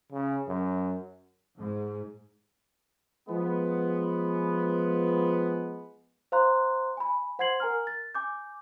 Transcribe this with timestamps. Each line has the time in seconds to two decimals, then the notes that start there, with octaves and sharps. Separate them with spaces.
0.12 C#3
0.48 F#2
1.58 G#2
3.29 F3 G#3 B3
6.32 C5 F5 A#5 C6 F#6
6.97 G#5 B5
7.39 C5 F#5 C6 G#6 C7 F#7
7.60 A#4 G#5 A#5 F6
7.87 A6
8.15 G#5 D6 G6